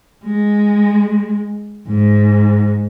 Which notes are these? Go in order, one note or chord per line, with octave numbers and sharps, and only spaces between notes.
G#3
G#2